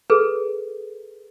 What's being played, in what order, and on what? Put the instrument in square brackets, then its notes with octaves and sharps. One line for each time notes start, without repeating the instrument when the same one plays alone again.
[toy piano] G#4 A4 B4